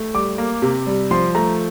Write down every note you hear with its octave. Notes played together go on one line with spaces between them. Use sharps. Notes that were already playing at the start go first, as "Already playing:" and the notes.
Already playing: A3
G3 D6
A#3
C3
G3
F3 C6
A3 A#5